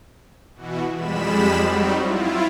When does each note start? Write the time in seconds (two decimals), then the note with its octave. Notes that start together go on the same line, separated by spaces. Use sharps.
0.54 B2 E3 F#4
0.93 F2 G3 G#3 B5 E7
1.63 F#3 G3 C4 D#4 F#4
1.98 E4 F4